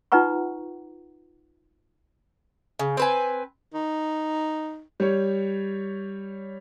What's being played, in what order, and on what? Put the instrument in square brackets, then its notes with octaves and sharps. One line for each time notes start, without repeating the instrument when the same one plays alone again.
[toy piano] D#4 F4 B4 F#5 A#5 C#6
[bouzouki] C#3
C4 B4 G#5
[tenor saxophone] D#4
[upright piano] G3 C#5